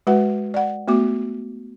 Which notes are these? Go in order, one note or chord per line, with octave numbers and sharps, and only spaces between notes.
G#3 F#4 B4 F#5
D5 F#5
A3 B3 F#4 D6